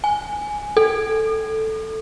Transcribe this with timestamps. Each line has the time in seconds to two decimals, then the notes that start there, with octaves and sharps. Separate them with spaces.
0.04 G#5
0.77 A4